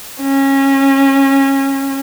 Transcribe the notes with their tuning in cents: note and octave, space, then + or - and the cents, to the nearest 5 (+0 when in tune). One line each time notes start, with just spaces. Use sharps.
C#4 -25